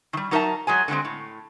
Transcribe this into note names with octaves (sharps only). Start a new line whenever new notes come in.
D#3 G3
F#3 D#4 A#4 C5 E5 A5
F#3 G#3 G#4 G#5
D3 G3 G#3 C4
A2